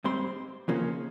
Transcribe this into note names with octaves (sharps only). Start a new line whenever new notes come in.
G#2 G3 C4 C6
F2 C#3 F3 A#3 C#4